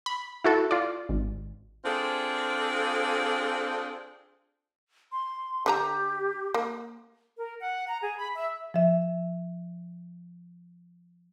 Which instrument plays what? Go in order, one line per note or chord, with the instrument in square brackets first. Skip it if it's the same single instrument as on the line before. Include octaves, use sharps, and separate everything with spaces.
[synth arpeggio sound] B5
E4 F#4 A4
F4 D5
G#1
[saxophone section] C4 D4 F4 G#4 A4 C5
[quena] C6
[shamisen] D3 D4 A#5 [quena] G4
[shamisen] A#3
[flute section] A#4
F#5
A#5
G#4
B5
E5
[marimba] F3 E5